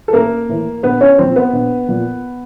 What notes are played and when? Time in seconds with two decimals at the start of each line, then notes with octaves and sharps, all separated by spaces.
0.08 A4
0.13 A1 A#3 A#4
0.49 A2 E3
0.83 A#1 B3 B4
1.01 C#4 C#5
1.18 A#2 F3 C4 C5
1.36 B3 B4
1.53 A#1
1.88 A#2 F3